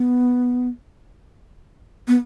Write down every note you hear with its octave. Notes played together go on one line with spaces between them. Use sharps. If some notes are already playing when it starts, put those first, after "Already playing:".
Already playing: B3
B3